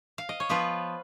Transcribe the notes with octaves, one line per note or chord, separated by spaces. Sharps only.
F5
D#5
C#5
F3 B3 F4 B4